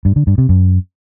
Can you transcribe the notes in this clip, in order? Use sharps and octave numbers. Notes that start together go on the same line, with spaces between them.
G2
D3
G2
C3
F#2